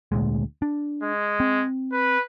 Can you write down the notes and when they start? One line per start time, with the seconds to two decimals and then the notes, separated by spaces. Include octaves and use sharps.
0.12 D2 A#2 G#3
0.62 D4
1.03 G#3
1.40 C4
1.92 B4